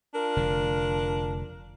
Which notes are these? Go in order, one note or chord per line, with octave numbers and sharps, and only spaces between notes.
D4 F4 A#4
F1 D3